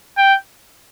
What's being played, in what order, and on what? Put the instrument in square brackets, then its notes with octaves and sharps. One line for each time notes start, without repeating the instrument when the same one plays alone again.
[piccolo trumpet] G5